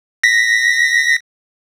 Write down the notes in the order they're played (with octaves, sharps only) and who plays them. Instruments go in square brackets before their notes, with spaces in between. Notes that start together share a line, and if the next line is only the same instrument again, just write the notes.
[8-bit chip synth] A#6 B6